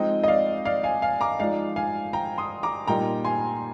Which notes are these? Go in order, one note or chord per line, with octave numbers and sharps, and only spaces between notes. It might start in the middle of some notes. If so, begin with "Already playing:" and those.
Already playing: F3 G#3 C4 D#4 D#5 G5
D#5
D5 F5
D5 F5
F5 G#5
F5 G#5
A#5 D6
F3 G#3 D#4 D5 F5
F5 G#5
G5 A#5
C6 D#6
A#5 D6
A#2 G3 A#3 D#4 G5 A#5
G#5 C6